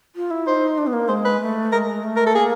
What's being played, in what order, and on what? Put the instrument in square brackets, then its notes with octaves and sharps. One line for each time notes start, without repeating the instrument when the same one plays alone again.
[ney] F4
E4
[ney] D#4 [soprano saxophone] C5
[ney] D4
B3
A#3
[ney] G#3 [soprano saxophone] C5
[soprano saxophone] B4
[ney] A3
[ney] G#3 [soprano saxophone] A#4
[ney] A3
[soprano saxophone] A#4
A4
[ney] A#3 [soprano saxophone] G#4